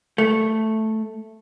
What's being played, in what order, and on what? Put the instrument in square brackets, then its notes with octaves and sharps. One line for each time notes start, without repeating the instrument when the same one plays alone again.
[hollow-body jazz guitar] A3